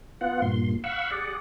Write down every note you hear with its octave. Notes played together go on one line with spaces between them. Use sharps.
B3 F4 F#5
G2 A#2 C6
F5 F#5 B5 C#6 E6
G4 G#4 D5 F#5